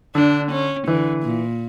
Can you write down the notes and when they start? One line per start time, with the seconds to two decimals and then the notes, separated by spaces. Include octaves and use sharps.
0.15 D3 D4
0.51 C#4
0.88 D3 E3
1.23 A#2